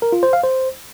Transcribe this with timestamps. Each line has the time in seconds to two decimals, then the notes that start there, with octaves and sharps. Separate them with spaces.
0.02 A#4
0.12 F4
0.23 C5
0.33 F5
0.43 C5